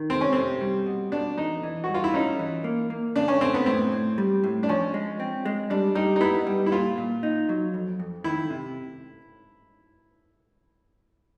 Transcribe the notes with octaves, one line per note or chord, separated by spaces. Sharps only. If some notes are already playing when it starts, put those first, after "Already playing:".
Already playing: D#3
C3 C4
C#4
C3 C4
G3
B2
B2 D4
E2 D#4
E3
G2 F#4
F4
E4
C#4 D#4
E3
A#3
A#3
C#3 D4
C#4
C#3 C4
B3
A2 C4
A2
G3
A2
D4
F3 C#4
G#3
C4
G#3
G3 D4
G3 D#4
D#4
B3 E4
G3
E4
A#2 F4
A#2
D#4
F#3
F2
F2
D#3 E4
C3